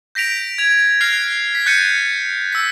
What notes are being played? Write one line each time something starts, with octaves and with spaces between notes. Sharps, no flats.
G6 A#6 B6 D7 F7
G#6 F7
F6 F#6 G#6 A#6 C7 F7
B6
F#6 G6 A6 C#7 D#7
E6 B6